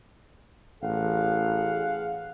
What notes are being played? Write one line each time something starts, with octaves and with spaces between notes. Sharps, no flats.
A1 G#4 F5 F#5